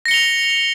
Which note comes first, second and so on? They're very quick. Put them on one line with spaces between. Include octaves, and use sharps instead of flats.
A#6 C#7 G7 F7